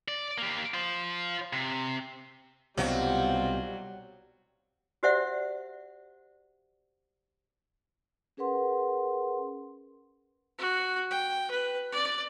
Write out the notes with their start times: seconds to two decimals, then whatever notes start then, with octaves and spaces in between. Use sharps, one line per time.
0.08 D5
0.38 A#3 G4
0.74 F4 C5
1.53 C3
2.77 C2 B2 F#3 G3 C4 F4 F#4
5.03 F#4 G4 C5 D5 E5 F#5
8.37 C#4 G#4 A#4 B4 F#5 C6
10.59 F#4
11.10 G5
11.51 B4
11.92 D5